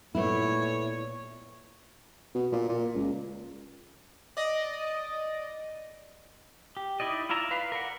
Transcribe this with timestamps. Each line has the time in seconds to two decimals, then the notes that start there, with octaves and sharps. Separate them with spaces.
0.15 A#2 A3 B3 E4 C#5
2.35 B2
2.52 A#2
2.69 A#2
2.95 C#2
4.37 D5 D#5
6.77 G4
7.00 D#4 E4 D5 D#5
7.29 E4 F4 D5 E5 A#5
7.51 B4 F5
7.72 A#4 D5 F#5